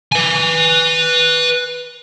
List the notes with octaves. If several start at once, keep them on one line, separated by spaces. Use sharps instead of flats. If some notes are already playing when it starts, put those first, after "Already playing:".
B4 G#5